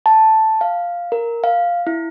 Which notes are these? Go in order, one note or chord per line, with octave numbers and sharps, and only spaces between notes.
A5
F5
A#4
F5
E4